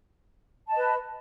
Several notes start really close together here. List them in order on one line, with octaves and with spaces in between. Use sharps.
A5 D#5 B4